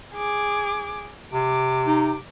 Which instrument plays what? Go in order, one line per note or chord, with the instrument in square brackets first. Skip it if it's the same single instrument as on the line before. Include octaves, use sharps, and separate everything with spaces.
[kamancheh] G#4 D6
[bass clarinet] C3 [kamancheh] D6
[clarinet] D#4